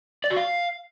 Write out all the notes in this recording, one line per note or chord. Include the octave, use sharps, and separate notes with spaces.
D5
F#4
F5